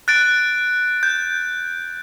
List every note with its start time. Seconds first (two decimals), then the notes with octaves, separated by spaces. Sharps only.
0.08 F#6 A6 D7
1.03 G6